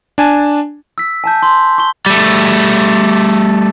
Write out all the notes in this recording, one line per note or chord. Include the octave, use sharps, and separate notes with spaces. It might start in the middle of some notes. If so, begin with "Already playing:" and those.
D4 G#5 A5
E6 B6
G#5 A5 G6
C6
C#6 G7
G3 A3